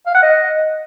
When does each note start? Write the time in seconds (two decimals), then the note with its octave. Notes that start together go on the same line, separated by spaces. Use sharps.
0.07 F5
0.14 F#5
0.22 D#5